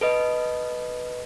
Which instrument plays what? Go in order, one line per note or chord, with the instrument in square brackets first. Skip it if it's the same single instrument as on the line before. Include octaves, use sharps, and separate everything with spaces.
[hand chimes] A4 B4 D#5